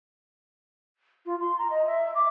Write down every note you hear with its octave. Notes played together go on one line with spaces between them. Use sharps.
F4
C6
A#5
D#5
E5
D6